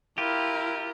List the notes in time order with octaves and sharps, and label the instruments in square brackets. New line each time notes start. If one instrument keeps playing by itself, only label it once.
[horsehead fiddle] E4 A#4 [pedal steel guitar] F4 G4